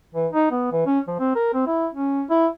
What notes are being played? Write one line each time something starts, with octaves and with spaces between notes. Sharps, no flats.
E3
D#4
B3
E3
C#4
F3
C4
A#4
C4
E4
C#4
E4